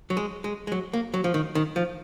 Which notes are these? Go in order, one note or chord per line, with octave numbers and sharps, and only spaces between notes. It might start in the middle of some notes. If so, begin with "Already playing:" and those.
F#3
G#3
G#3
G#3
F#3
A#3
F#3
F3
D#3
D#3
F3